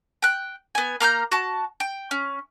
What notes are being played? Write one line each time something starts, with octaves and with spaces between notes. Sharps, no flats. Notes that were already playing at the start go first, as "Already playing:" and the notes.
G5 F#6
B3 G#5
A#3 A#5 F6 G6
F#4 A5
G5
C#4